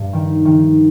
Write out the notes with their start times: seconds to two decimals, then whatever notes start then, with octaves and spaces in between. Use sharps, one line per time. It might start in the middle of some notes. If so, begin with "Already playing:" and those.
Already playing: G2
0.13 D#3
0.45 D#3